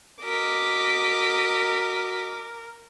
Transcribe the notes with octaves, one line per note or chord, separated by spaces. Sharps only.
F#4 A#4 D#5 D6 B6